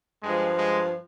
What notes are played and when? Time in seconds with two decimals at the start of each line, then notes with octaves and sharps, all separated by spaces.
0.23 G2 F3 G#3
0.58 G#3